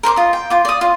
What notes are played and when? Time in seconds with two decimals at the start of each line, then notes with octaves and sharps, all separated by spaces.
0.03 A#4 C5 C6 D6
0.16 F4 D#5
0.33 G5
0.50 F4 D6
0.65 D5 D#6
0.81 F4